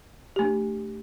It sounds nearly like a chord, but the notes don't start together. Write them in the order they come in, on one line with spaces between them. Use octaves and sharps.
G4 A3 D4